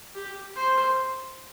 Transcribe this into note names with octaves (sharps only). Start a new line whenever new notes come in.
G4
C5